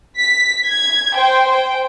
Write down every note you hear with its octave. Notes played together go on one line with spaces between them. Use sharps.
B6
G#6
C5 G5
G5